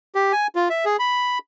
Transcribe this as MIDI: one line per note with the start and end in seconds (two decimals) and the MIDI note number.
0.15 0.32 67
0.33 0.47 80
0.56 0.68 65
0.70 0.85 76
0.85 0.97 68
0.99 1.38 83